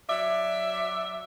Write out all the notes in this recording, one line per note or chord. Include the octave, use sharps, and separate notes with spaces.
F#3 D5 E5